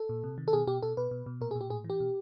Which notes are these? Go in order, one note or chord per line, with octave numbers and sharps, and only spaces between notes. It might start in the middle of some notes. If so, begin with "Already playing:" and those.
Already playing: A4
A#2
C3
D#3
A4
B2 G#4
B2 G4
B2 A4
B2 B4
B2
B2
A#2 A#4
G#4
A#2
G4
A2 G#4
E3
G4
B2